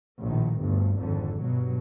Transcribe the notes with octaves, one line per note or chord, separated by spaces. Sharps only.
A#1 A2 D#3
G1 D2 G2
G#1 F2 D3
G2 B2 F#3